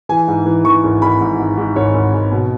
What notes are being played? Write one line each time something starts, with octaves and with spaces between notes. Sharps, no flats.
E3 G#5
G#2
E3
E3 C#6
G#1
G#1 B5
G#2
G#2
G#2
G#1 C#5
G#1
G#1
B2